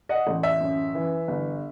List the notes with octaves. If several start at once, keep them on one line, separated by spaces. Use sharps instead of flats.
D#5 F#5
A1
E5
F#2
E3
G1